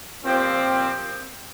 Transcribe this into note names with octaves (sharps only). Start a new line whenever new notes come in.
A#2 F3 C4 G4